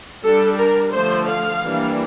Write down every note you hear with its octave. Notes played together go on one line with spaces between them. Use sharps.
G3 D4 A4
A#4
D3 F3 A3 C5
F5
E3 G3 A#3 D4